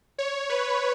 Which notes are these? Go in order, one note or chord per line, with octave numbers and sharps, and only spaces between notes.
C#5
B4